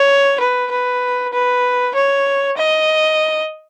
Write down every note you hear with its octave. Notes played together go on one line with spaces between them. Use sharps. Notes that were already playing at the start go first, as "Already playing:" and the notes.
Already playing: C#5
B4
B4
B4
C#5
D#5